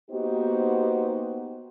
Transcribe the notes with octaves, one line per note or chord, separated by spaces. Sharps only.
A#3 B3 D#4 F#4 G4 C5